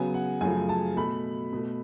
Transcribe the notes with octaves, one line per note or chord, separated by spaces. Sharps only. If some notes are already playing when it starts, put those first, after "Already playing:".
Already playing: C#3 F#3 B3 G#5
F#5
F#2 C#3 F3 A3 G#5
A5
B2 A3 B5
B2 A3